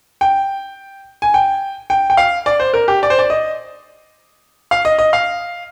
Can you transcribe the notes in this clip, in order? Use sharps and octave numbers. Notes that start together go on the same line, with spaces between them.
G5
G#5
G5
G5
G5
F5
D5
C5
A#4
G4
D5
C5
D5
D#5
F5
D#5
D#5
F5